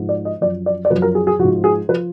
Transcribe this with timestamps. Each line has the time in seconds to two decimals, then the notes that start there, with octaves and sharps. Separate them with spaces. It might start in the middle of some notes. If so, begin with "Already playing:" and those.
Already playing: G#2 F3
0.09 D5
0.25 D#5
0.41 F#2 F3 D5
0.66 D5
0.85 D5
0.90 F#2 F3 B4
1.02 A#4
1.15 G#4
1.27 G#4
1.39 F3 F#4
1.44 G#2
1.64 G#4
1.89 F3 B4